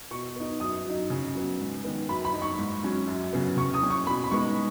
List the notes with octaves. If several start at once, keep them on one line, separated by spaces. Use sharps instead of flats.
B2 C#6
B3 D#4
F#2 D#6
F#3 D#4
C#3
F#3 B3
G#2
D#3 B3
F#2 B5
B5
F#3 D#4
C#6
G#2
F#3 C#4
F#2
C#3 F#3 B3
C#3 C#6
D#6
F#3 C#4
C#6
B2 B5
B5
G#3 B3 D#4 C#6